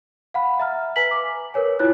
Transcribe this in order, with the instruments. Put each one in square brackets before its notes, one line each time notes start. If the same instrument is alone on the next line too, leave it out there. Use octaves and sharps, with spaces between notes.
[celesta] F5 F#5 B5
E5 A#5 F6
B4 G#5 A#5 B6 F#7
D6
A#4 B4 C#5 G#5
E4 F4 C#5 F#6